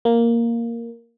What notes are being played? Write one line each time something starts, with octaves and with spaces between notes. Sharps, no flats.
A#3